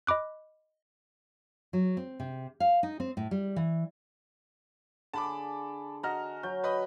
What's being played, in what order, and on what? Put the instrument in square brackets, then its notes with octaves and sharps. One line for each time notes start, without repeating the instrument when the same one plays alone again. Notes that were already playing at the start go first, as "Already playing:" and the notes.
[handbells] D#5 B5 D6 F#6
[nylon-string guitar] F#3
C4
C3
F5
D#4
C4
A2
G3
E3
[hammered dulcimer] D3 G#4 [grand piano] A5 B5 D6
[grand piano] F#4 D#5 F6 [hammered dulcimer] A#5
[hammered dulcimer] F#3 [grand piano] G6
[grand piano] B4 D#5 B5